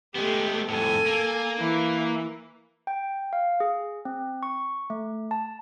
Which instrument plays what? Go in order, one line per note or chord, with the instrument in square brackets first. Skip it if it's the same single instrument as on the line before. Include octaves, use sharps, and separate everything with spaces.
[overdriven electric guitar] G#3 B3 [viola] A3 G4
[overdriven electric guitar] F2 A2 [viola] A4 G#5
[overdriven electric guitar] A#3
[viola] E3
[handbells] G5
F5
G#4
C4
C#6
A3
A5